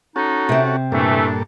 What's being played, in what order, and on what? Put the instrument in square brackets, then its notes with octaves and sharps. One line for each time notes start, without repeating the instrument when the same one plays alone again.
[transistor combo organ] C#4 F#4 A4 [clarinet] D#4
[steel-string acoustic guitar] C3 C4
[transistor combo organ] G2 A#2 A4 [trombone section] E3 A3 [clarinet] D4